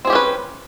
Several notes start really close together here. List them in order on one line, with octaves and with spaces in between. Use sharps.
C4 G#4 G4 C#4 B4